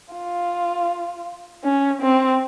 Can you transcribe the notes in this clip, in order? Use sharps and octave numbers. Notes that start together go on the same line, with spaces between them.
F4
C#4
C4